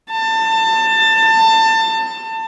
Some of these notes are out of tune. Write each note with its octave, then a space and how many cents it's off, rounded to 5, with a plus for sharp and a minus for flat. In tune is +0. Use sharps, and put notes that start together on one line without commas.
A5 +25